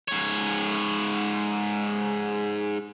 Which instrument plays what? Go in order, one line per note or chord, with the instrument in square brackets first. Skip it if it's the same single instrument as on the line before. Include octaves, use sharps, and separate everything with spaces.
[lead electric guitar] G#2 C#5